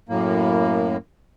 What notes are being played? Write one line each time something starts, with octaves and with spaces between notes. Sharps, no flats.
F#2 A2 A#3